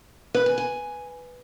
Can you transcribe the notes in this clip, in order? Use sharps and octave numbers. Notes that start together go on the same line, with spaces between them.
B4
G#5
G#5